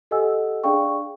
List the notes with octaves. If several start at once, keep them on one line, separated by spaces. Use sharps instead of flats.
G4 A4 D#5 F#5 G#5 E6
D4 G#4 D5 F5 G5 C#6